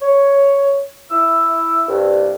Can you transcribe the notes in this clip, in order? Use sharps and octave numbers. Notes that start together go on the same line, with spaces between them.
C#5
E4 E6
C2 G2